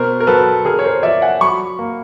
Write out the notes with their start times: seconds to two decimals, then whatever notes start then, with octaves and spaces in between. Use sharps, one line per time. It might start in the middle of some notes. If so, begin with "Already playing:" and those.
Already playing: B2 A#4 C5
0.20 A#4
0.27 F#3 A4 B4
0.65 D3 G#4 A#4
0.79 C#5
0.85 A#4 C5
1.03 F3 D5 E5
1.22 F#5 G#5
1.40 F#3 B5 C#6
1.79 A#3